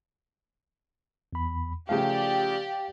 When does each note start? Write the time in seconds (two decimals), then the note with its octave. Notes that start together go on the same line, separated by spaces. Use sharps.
1.33 E2 B5
1.89 C#3 F3 A3 G4 D5 F5 G5